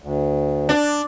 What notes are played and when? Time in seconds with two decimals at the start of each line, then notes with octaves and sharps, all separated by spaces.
0.02 D2
0.69 D4